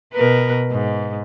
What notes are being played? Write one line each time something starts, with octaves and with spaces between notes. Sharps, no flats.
B2 A#4 B4
G#2